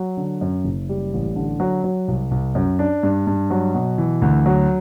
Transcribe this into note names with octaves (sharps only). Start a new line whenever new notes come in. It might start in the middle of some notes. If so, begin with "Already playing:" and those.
Already playing: F#3
D3
F#2
F#1
G3
A1
D3
F#3
F#3
C2
C2
F#2
D4
G2
G2
F#3
B2
E3
D2
F#3